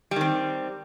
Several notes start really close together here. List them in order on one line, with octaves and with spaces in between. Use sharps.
G3 D#3 C4